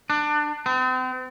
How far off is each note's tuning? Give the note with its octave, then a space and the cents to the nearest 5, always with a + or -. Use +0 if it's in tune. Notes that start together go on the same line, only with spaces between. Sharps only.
D4 +20
C4 -40